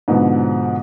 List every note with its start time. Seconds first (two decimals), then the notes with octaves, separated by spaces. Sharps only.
0.08 G#2 B2 D3 F3 B3